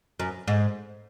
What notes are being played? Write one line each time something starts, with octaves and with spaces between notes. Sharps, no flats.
F#2
G#2